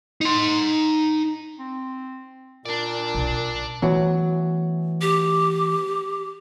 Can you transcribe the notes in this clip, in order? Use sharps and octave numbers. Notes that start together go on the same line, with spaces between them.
D#4 C6
C4
A#2 D4 A#4 D5
B1
E3 F#3 A3 B3
G4